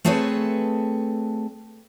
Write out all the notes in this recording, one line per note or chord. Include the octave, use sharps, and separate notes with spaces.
A3 C4 G#4 A4 B4 C#5